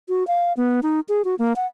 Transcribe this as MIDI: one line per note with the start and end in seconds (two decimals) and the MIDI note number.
0.09 0.26 66
0.27 0.53 77
0.57 0.80 59
0.83 1.00 63
1.09 1.25 68
1.25 1.35 66
1.39 1.53 58
1.56 1.66 78